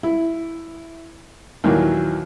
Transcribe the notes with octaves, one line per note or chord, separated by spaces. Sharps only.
E4
D#2 A#2 E3 F#3 A#3